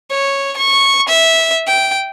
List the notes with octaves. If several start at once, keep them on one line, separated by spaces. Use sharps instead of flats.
C#5
C#6
E5
G5